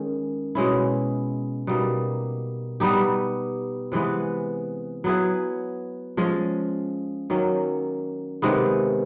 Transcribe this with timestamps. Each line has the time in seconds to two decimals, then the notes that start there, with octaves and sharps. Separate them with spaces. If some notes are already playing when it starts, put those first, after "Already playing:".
Already playing: D#3 G#3 C#4
0.55 B2 G#3 C#4 E4
1.67 B2 G3 A#3 D#4
2.80 G3 B3 D#4 G4
3.92 C3 E3 G#3 B3
5.04 F#3 B3 E4 G#4
6.17 F3 G#3 C#4
7.30 D#3 F#3 A#3 C#4
8.42 C3 D#3 G#3 B3